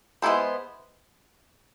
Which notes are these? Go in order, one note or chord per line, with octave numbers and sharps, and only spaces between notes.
G#3 B3 E4 A4 C5